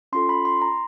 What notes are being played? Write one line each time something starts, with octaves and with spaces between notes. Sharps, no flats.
C#4 F4 A4 C6
B5
C6
A#5